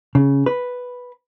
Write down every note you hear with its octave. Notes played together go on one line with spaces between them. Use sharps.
C#3
B4